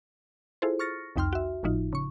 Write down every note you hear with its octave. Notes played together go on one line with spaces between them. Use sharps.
E4 F4 G#4 A4 C5
C#6 F6 A6 A#6 C#7
C2 F2 D#4 G5 C6 F6
F#4 E5
G#1 A2 F3 D#4 F4
C#3 C#6